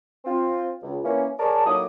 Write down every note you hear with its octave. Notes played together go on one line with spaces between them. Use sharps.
C4 F4
C#2
E3 A#3 C#4
G#4 A#4 C#5 D5 A5
A2 F#3 A#3 D#4 D6 D#6